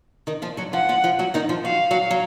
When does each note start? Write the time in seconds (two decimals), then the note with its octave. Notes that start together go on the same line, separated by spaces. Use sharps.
0.27 D#3 D#4
0.42 F3 F4
0.57 F#3 F#4
0.73 F3 F4 F#5
0.89 F3 F4
1.04 F3 F4
1.19 F#3 F#4
1.34 D#3 D#4
1.49 F3 F4
1.65 F#4 F5
1.91 F#3 F#4
2.11 F#3